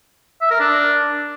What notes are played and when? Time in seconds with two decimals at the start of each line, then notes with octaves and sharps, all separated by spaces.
0.42 E5
0.51 A#4
0.60 D4